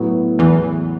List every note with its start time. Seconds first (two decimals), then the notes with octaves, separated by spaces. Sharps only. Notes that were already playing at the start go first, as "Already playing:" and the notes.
Already playing: A2 F#3 B3
0.39 E2 E3